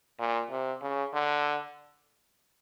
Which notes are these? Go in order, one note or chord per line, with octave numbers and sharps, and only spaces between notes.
A#2
C3
C#3
D3